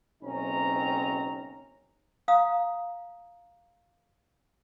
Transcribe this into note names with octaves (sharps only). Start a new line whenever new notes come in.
F#1 B1 C4 C#4 D#4 A#5
F5 A#5 D#6